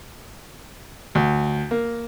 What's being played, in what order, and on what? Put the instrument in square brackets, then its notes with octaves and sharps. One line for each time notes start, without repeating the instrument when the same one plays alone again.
[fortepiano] D2
A#3